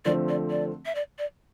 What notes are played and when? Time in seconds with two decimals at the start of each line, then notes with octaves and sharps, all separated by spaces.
0.05 D3 F3 A3 C4 D5
0.28 D5
0.50 D5
0.85 E5
0.95 D5
1.18 D5